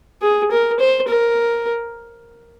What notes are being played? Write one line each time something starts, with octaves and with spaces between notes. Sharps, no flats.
G#4
A#4
C5
A#4